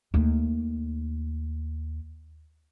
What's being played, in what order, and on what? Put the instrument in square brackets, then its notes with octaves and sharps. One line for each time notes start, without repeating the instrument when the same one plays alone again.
[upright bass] D#2 A3